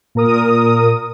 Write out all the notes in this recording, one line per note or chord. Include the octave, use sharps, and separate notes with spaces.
A#2 A#4 D#6